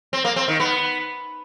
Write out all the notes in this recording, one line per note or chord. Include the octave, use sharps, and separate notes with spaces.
C4
A#3
C4
D#3
B3